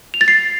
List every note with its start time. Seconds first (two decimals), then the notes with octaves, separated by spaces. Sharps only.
0.14 F7
0.21 A6
0.28 C7